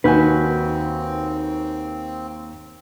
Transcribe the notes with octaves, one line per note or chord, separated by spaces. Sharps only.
D#2 C4 D#4 F#4 B4 G#5 G6